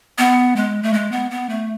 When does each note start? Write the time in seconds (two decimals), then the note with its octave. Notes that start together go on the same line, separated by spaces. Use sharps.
0.18 B3
0.56 G#3
0.83 A3
0.94 G#3
1.12 B3
1.31 B3
1.49 A3